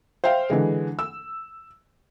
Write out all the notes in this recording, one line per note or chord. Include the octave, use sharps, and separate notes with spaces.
C5 E5 F5 G5
D3 E3 G#3
E6